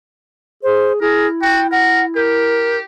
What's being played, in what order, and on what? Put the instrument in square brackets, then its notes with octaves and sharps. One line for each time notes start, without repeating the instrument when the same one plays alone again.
[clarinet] G#4 [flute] C5
[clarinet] E4 [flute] G#4 [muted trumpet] A#4
[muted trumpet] F#4 [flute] G5
[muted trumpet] A#4 [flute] F#5
[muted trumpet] G4 [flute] A#4